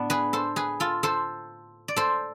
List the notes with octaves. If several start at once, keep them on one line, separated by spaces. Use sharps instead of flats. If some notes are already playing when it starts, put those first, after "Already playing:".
Already playing: A2 B3 D4
G#4 B4
A4 C5
G#4 B4
F4 A4
A4 C5
D5
A4 C5